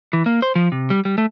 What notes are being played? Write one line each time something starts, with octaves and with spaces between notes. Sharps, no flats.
E3
A#3
C5
F3
C3
G3
G3
A3